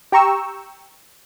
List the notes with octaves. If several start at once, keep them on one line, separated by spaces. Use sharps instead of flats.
G4 G5 A#5 C#6 E6